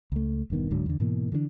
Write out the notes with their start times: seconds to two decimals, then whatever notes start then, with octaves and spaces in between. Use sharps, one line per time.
0.12 C#2 A3
0.50 E1 G2 D#3 B3
0.70 D1 G#2 D3 F#3
0.86 E2 D3
1.00 G#2 B2 E3 A#3
1.32 D3 E3 G#3 D4